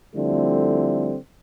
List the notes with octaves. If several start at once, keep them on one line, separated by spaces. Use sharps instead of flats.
D3 F3 G3 A3 C4 E4